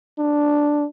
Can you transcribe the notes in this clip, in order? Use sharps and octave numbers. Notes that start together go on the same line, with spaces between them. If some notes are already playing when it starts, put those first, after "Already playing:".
D4